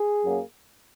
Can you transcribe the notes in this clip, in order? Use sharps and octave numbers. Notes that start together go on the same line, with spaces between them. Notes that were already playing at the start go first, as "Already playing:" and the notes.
Already playing: G#4
F#2 F#3 A#3